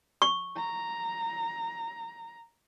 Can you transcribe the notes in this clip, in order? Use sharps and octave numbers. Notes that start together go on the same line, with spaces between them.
C#6
A#5